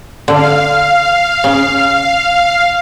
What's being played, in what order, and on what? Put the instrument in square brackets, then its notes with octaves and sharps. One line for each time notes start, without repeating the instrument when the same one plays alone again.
[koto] D3 [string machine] F5
[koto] C#3